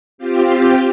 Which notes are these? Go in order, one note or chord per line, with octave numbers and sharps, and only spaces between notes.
C4 F4 G4